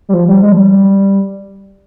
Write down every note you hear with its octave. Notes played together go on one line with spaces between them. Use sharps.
G3
F3
G3
G#3
F3
G3